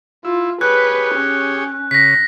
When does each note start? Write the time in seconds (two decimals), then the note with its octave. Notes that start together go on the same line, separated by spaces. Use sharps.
0.25 E4 F4
0.61 G4 G#4 B4 C#5 F#6
1.15 C#4
1.91 C#3 A#6 B6